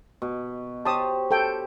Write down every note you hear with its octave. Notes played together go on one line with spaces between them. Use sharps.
B2
G4 C5 C#5 A5 D#6
A4 G5